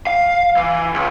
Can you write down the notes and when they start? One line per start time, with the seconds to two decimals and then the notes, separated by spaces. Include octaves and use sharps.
0.07 F5
0.57 E3
0.94 C#2